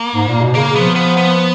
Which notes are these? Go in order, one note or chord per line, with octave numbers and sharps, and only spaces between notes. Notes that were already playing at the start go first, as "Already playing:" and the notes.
Already playing: A#3
G#2
A#2
B2
C#3 A#3
F3 B3
B3
B3